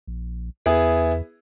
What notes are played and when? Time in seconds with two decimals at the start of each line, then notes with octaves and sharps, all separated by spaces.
0.07 A#1
0.66 E2 B3 E4 G#4